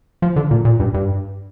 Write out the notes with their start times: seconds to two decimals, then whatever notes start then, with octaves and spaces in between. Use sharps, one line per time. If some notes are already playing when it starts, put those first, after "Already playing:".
0.22 F3
0.36 D3
0.51 A#2
0.65 A#2
0.80 G2
0.94 G2